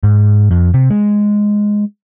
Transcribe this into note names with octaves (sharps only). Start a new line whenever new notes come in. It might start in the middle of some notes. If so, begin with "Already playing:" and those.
G#2
F2
C3
G#3